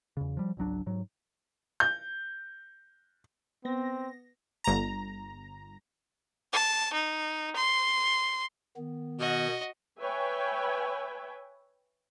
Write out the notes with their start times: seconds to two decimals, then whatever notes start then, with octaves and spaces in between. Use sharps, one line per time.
0.17 E2 C#3
0.37 F3 G3
0.57 G#1 C#2 F#3 D4
0.86 G#2 F#3
1.80 G6
3.65 B3 C4 A#6
4.64 G1 A#5
6.53 A5
6.93 D#4
7.56 C6
8.77 D#3 B3
9.19 B2 F#4 D#5
9.99 B4 C#5 E5 G5 G#5